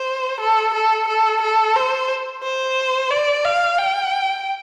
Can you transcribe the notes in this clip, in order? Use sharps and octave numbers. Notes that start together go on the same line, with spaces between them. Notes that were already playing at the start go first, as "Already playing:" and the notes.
Already playing: C5
A4
A4
A4
A4
C5
C5
D5
F5
G5